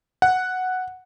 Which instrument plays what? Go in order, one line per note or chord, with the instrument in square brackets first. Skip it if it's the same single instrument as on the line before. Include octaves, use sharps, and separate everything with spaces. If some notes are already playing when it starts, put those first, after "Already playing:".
[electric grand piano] F#5